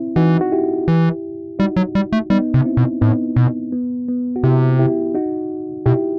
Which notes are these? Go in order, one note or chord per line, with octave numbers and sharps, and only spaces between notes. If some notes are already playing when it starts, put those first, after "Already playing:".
Already playing: C4 E4
E3 D#4 F#4
F#4
E4 G4
E3
G3 D#4 F#4
F#3
G3
A3
G3 B3 D#4
C3
C4 E4
B2
A2 B3 D#4
B2
B3
B3
F#4
C3 E4 G4
E4 G4
D#4 F#4
B2 E4 G4